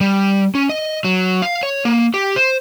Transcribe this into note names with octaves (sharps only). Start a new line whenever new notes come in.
G3
C#4
D#5
F#3
F5
C#5
A#3
G4
C5